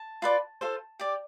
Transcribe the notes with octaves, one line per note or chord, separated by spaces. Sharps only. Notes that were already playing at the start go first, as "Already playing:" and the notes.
Already playing: A5
F4 B4 D5
F4 A4 C5
G4 D5